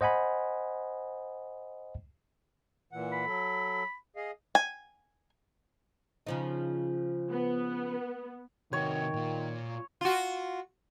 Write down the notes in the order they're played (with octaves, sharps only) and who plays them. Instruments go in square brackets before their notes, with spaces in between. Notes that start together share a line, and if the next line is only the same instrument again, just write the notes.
[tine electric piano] C5 D#5 F#5 G#5 B5
[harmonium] A#2 E3 F#5
[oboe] B5
[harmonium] F#3 A4
G#4 D#5 F5
[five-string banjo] G#5
[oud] C#3 F3 D#4
[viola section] B3
[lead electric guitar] C3 F#4 [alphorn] D#3 [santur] C#5 [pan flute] G5
[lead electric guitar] A#2 F4
[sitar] F4 F#4